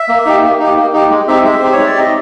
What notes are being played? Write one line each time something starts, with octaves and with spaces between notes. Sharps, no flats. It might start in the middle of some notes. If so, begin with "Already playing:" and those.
Already playing: E5
A#3
D#4 G4
A#3
D#4 G4
A#3
D#4 G4
G#3
C4 D#4 G4 E5
G#3 E5
C4 D#4 G4 C5
C#5
G#3
D5
C4 D#4 G4 D#5